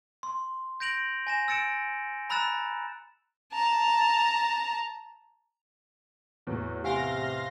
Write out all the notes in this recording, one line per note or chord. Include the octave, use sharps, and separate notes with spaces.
C6
G6 A#6 D7 F7 F#7
G#5 A#6 E7
E6 A6 C#7 D7 E7
A#5 B5 E6 F#6 A6 E7
A5 A#5
E2 A2 F#3
C3 G4 F5 F#5 G#5 C6 A#6